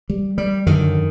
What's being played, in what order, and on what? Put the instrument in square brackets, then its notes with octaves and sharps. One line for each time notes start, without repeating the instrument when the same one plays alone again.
[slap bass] G3
G3
F#2 D3 D#3